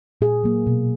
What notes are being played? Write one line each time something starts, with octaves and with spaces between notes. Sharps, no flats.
A#2 G#4
F#3 A#3
B2